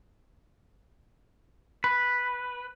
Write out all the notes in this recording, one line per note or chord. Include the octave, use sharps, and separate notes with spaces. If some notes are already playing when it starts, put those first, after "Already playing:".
B4